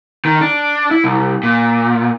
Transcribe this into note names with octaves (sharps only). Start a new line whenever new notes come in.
D#3
D4
E4
C2
A#2